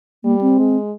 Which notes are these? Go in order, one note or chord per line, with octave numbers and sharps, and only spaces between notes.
G3 A#3
C4
G#3